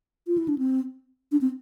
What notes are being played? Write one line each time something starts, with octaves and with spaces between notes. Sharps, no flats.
F4
E4
D4
C4
D4
C4